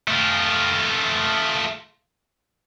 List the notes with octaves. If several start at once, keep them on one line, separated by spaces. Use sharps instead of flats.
A3 F4